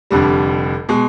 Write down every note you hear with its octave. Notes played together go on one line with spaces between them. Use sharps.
F1 F2 D3 G3
B2 G#3